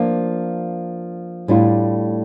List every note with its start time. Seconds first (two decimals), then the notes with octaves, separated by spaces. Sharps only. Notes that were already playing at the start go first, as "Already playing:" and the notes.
Already playing: F3 A#3 D4 F4
1.48 A2 G3 D4 F4